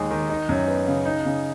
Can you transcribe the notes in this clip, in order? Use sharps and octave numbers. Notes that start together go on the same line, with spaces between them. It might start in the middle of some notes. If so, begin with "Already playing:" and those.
Already playing: D#2 G#3 D#4
D#3
D#4
F#2
B3
C#3
D#4
C#3